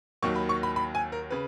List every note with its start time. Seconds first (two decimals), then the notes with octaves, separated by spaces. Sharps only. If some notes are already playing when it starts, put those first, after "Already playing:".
0.22 D#2 D#3 F#3 C#6
0.36 B5
0.49 C#6
0.63 B5
0.76 B5
0.95 G#5
1.12 A#4
1.30 C#3 B4